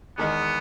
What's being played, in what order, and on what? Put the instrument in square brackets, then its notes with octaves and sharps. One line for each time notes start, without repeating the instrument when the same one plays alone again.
[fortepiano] E2 D#3 G#3 [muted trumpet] B3